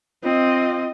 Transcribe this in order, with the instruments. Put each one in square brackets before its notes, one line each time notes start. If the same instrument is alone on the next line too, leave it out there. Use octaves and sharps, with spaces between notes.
[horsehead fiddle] C4 D#5 [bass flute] F4